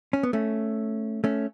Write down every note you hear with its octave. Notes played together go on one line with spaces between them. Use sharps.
C#4
B3
A3 C#4
A3 C#4